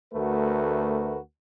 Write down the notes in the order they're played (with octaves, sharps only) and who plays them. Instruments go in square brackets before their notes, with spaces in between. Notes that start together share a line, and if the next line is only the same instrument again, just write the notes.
[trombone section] D2 A3 F#4 A#4 B4